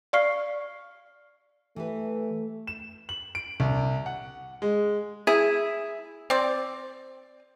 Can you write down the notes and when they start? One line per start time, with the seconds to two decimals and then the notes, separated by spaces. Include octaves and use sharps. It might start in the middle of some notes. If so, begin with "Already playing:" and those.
0.13 D5 F5 C#6 F6 C7
1.76 E3 A3 G4 B4
2.67 E7
3.09 F#7
3.35 D7
3.60 C2
4.06 F#5
4.62 G#3
5.27 E4 G#4
6.30 C4 D5